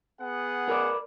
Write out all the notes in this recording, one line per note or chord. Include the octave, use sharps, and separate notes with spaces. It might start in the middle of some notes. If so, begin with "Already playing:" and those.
B3 G#4 F#5
A#4 B4 D5